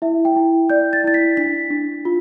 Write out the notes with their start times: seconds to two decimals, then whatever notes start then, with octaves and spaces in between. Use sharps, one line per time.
0.02 E4 E5
0.25 G5
0.36 E4
0.70 D5 G6
0.93 A6
1.04 E4 A6
1.14 B6
1.37 D4 B6
1.70 D4
2.05 F4